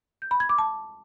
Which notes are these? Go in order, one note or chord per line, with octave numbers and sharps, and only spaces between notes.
G6
B5
G#6
D6
A5